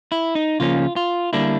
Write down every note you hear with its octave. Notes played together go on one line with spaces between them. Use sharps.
E4
D#4
C#3 F3 A#3 C#4 F4
F4
D3 G3 A#3 D4 E4